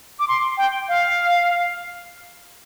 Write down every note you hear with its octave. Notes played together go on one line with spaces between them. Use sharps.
D6
C6
G5
F5